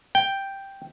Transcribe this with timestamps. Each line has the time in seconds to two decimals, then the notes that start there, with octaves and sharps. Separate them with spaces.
0.15 G5